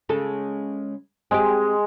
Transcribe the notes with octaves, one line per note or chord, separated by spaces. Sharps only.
C#3 G#3 A4
G#3 C4 G4